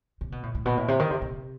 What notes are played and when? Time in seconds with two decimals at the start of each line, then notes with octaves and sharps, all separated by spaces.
0.21 C3
0.32 B2
0.43 A2
0.55 A2
0.65 B2
0.77 A2
0.88 C3
0.99 D#3
1.11 C3
1.22 C3